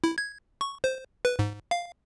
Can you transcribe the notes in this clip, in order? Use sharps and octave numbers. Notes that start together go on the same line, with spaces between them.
E4
G#6
C#6
C5
B4
G#2
F5